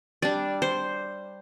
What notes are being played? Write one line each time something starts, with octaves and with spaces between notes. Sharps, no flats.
G3 D4 D5
C5